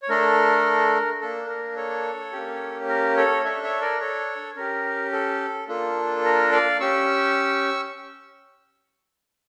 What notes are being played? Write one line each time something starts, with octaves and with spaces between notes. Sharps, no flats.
C#5
A3 D4 A4 A#4
A#3 D4 A4
A#4
A4 C#5
A#3 C#4 G4
A#4
A4 C#5
D4 A4 C#5 E5
C#5 E5
A#4 D5
A4 C#5
C#4 G4 A#4
A4
A#3 D4 F4 A4
A#4
D5 F5
C#4 G4 C#6 E6